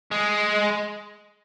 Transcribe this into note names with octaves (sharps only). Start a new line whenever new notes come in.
G#3